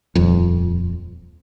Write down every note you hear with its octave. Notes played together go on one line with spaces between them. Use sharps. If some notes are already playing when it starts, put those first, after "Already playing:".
D#1 F2